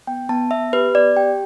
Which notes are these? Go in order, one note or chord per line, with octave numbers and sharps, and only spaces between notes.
B3 G5
B3 A5
B3 E5
G4 B4
B3 D5
G4 G5